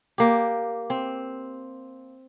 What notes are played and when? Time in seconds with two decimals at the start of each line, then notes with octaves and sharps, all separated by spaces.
0.18 A#3 G4
0.90 C4